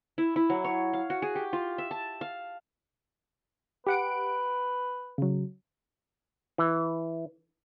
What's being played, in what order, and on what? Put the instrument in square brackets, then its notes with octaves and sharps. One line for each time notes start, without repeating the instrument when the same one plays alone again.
[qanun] E4
E4
F#3
C#5
F5
F#4
G#4
G4
F4
E5
A5
F5
[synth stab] G4 F#5 D7 [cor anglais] B4
[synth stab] C#3 F#3
[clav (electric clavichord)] E3